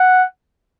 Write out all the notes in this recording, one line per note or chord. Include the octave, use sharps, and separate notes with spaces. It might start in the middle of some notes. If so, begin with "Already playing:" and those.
Already playing: F#5